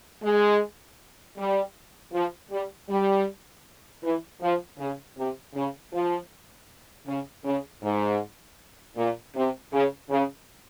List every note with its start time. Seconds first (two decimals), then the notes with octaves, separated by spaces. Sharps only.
0.23 G#3
1.37 G3
2.13 F3
2.50 G3
2.88 G3
4.02 E3
4.41 F3
4.79 C#3
5.17 C3
5.54 C#3
5.93 F3
7.06 C#3
7.44 C#3
7.83 G#2
8.96 A#2
9.35 C3
9.72 C#3
10.10 C#3